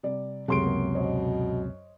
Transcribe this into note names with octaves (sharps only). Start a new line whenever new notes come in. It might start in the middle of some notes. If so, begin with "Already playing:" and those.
C3 G3 D5
C#2 F#2 C3 A3 G4 G#4 C6 D7
A#3 B3
B2 C5 C#5 D#5